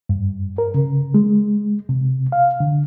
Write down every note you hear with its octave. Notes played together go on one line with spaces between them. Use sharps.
G2
A#4
C#3
G#3
C3
F5
D3